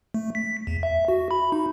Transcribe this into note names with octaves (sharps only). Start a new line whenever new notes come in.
A3
B6
E2
E5
F#4
B5
D#4